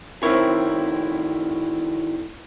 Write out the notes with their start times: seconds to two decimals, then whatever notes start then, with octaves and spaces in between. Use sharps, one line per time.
0.23 A2 D#3 C4 E4 A#4 C#5